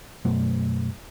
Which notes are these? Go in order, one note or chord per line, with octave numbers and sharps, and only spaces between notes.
F#2 B2 F#3 A3